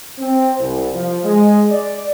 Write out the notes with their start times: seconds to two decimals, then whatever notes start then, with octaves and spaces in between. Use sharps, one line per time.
0.19 C4
0.61 C2
0.94 F3
1.24 G#3
1.71 D5